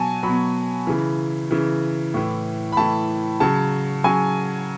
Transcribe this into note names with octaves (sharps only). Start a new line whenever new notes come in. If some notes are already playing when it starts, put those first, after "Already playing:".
Already playing: B2 F#3 G#5 A5
B2 F#3 B5
C#3 E3
C#3 E3
A2 E3
B5
A2 E3 A5
C#3 F#3 A5
C#3 F#3 G#5